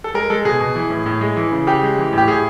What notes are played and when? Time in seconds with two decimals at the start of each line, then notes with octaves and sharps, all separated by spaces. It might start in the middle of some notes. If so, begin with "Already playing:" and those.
0.04 A4
0.14 G#3 A#4
0.30 G#3 A4
0.45 B2 G#4
0.60 B2
0.75 E3
0.90 A2
1.06 A2
1.21 G#3
1.37 E3
1.52 C#3
1.67 C#3 G4
1.83 G#3
1.98 E3
2.13 A2
2.18 G4
2.28 A2 G#4